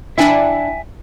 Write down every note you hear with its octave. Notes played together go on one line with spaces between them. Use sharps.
D4 E4 E5 G5 G#5